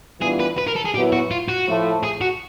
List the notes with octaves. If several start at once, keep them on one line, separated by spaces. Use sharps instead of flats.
E3 G3 B3 D4 F4 G#4
B4
B4
A#4
A4
G#4
A#2 F#3 B3 E4 G4
F#4
F4
F#4
A2 F3 A3
G#4
F#4